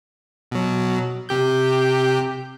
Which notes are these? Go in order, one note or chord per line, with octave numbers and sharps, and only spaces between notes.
B2 F#3
C3 G4 G6